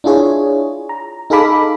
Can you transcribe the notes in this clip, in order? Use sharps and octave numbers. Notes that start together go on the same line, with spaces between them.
D4 E4 F4 G#4 C#5
A#5
D#4 G#4 A4 F5 B5 D6